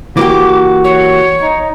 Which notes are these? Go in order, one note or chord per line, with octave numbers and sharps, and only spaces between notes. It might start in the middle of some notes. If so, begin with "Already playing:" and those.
E3 A#3 F#4 G4 D6
C#5
D#4